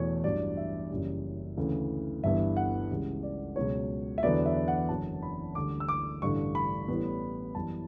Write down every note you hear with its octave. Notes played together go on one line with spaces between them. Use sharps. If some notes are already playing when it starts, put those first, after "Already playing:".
Already playing: E2 B2 A3 C#5
A1 G2 F#3 D5
E5
F#1 F#2 C#3 E3 G3
D2 C#3 E3
G1 G2 E3 B3 E5
F#5
C#2 C#3 E3 G3
D5
C#2 B2 F#3 C#5
E5
E2 D3 F#3 B3 D5
E5
F#5
F#1 F#2 D3 F#3 A5
B5
D2 D3 G3 D6
E6
D6
A1 G2 D3 C#6
B5
A1 A2 E3 G3 B3
F#2 E3 G3 B3 A5